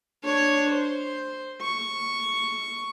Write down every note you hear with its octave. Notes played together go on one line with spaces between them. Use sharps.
D4 C#5
C5
C#6